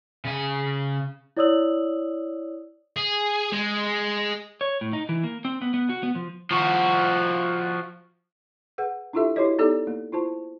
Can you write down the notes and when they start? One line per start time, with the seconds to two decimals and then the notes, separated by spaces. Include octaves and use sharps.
0.25 C#3 G#5
1.37 E4 C#5 D5 D#6 E6 F#7
2.96 G#4
3.53 G#3
4.61 C#5
4.81 A2
4.93 D#4
5.09 E3
5.23 A#3
5.45 C4
5.62 B3
5.74 B3
5.89 F#4
6.03 B3
6.15 F3
6.51 F3 F#4
8.78 G#4 B4 F#5
9.13 D4 E4 F4 G4 A4 E5
9.36 E4 F#4 G4 B4 C#5 D#5
9.58 B3 D#4 G4 A4 D5
9.87 A#3
10.12 E4 F4 C5 A5